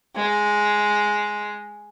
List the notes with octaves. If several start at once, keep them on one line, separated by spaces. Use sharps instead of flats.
G#3